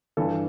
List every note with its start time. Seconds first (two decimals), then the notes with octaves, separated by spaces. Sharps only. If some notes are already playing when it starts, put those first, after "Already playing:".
0.17 G2 E3 A4